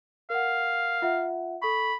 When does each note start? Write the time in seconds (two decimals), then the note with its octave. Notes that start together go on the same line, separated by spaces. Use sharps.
0.30 A#4 F5 F#5
1.02 F4 E5 F#5
1.62 A4 B5 C#6